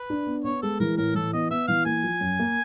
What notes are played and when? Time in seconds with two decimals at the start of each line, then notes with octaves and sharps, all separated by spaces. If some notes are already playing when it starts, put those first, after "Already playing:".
Already playing: B4
0.10 D4
0.27 B3
0.44 B3 C#5
0.62 G#3 A4
0.80 E3 A#4
0.97 A2 A#4
1.15 E3 A4
1.33 B3 D#5
1.50 B3 E5
1.68 E3 F5
1.86 A#3 G#5
2.03 F3
2.21 F#2
2.39 A#3